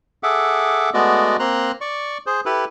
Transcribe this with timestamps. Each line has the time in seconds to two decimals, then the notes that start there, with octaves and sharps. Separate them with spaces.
0.23 G#4 A4 E5 F#5 D6
0.94 G#3 A3 B3 F#4 D5 D#5
1.39 A#3 C4 A#5 C6 F#6
1.81 D5 C#6
2.26 G#4 C5
2.45 E4 G4 A4 B4